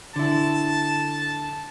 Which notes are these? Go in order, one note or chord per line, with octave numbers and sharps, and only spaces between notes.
D3 E4 A5